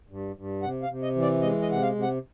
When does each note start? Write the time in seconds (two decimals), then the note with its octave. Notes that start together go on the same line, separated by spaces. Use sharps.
0.09 G2
0.36 G2
0.63 C3 F#5
0.82 F5
0.89 C3
1.03 D#5
1.16 E3
1.22 D5
1.42 G#3 D#5
1.62 D#5
1.69 C3 F#5
1.82 F5
1.95 C3
2.03 F#5